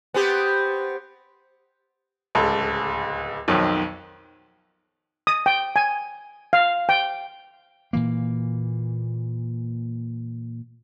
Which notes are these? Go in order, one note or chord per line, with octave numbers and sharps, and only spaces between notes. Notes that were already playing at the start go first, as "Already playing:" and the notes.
B3 C4 G4
D1 C#2 A4
B1 F2 D#3 F#3
D#6
G5
G#5
F5
G5
A#2 E3 A#3